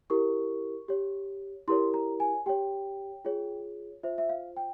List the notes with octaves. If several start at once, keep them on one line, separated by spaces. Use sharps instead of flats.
E4 G4 A#4 C#6
G4 C#5
E4 G4 A#4 C#5 C6
A#5
G#5
G4 C#5 G5
F4 G#4 C#5
F4 C5 E5
E5
F5
G5